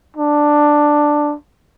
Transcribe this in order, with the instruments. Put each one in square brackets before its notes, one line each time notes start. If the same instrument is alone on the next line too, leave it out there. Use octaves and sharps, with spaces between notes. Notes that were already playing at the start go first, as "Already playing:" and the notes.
[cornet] D4